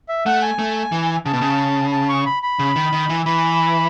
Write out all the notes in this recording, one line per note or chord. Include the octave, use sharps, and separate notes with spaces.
E5
A3 F#5
G#5
A3
E3
C#3 A5
B2
C#3
A5
C#6
B5
B5
C#3
D#3
D#3
E3
E3 B5